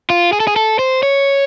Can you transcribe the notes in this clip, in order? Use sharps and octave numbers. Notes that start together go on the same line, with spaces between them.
F4
G#4
A4
G#4
A4
C5
C#5